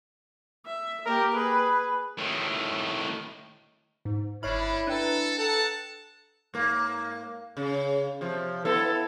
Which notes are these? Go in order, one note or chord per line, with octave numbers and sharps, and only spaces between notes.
E5
A#3 G4 A#4
G#4 B4
A2 D#3
G#2
G1 C#4 D4 E4 C#5 B5 F6
D4 A4 B4 G5 A#5
A4 F#5 A5
G#2 A#3
C#3
C3 F3
B3 E4 A4